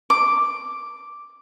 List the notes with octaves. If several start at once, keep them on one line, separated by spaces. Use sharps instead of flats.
D6